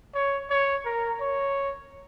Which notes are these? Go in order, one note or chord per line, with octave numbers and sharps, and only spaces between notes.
C#5
C#5
A#4
C#5